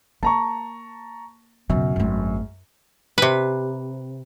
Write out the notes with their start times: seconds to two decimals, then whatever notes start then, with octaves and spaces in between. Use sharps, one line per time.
0.23 A#3 A5 A#5 C#6
1.69 F#1 F#2 B2
1.96 G#1 A3
3.18 C3 B4